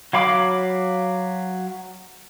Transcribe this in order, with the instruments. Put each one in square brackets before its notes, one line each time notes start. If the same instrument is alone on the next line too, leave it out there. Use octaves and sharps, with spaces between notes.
[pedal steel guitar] F#3 F5 B5 D6